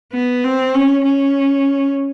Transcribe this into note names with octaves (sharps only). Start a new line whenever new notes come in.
B3
C4
C#4
C#4